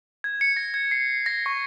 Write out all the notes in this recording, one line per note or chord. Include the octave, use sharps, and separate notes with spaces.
G#6
C#7
A#6
G#6
C7
A#6
C#6